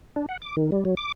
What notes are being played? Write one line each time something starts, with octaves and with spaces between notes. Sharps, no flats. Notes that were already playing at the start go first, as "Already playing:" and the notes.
D4
F#5
D6
D#3
G3
F#3
D6